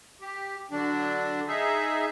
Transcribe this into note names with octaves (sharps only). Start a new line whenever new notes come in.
G4
D3 F#3 D4
D#4 G#4 E5